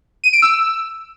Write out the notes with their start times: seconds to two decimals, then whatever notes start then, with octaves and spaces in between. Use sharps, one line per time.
0.24 D#7
0.33 D7
0.42 E6